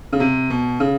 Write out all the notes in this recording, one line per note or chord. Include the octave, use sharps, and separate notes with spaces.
C#3
C3
B2
C#3